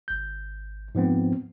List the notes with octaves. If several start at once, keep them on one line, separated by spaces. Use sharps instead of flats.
G#1 G6
G#2 F3 B3 C4